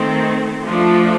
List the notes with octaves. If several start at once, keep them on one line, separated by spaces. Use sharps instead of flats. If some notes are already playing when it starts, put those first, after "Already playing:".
Already playing: D#3 A3 C4
F3 A3 D4